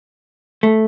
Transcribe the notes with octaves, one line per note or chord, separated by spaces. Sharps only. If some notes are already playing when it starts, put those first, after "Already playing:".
A3